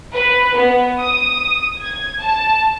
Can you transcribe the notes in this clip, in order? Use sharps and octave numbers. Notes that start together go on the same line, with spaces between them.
B4
B3
D#6
G#6
A5